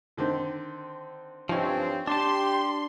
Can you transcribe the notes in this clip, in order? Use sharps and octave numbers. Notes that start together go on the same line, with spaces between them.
D3 D#3 C4
G2 F3 C4 C#4 D#4
D4 G4 A5 C6